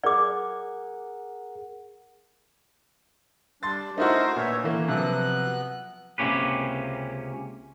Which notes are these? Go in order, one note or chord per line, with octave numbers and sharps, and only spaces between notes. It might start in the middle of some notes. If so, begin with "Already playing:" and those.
G#4 A#4 D5 F#5 D6
G3 D4 C6 A6
A3 D#4 E4 F#4 A#4 C5
A#2 B3 C#5 E5
E3 A3 A#3
C3 F3 F#3 B3 F#6
C#2 C3 A#3 C#4 G4 B4